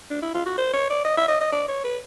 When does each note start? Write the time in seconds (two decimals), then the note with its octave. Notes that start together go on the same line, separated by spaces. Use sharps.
0.11 D4
0.22 E4
0.34 F4
0.46 F#4
0.58 C5
0.73 C#5
0.90 D5
1.05 D#5
1.18 E5
1.28 D#5
1.41 D#5
1.52 D5
1.68 C#5
1.84 B4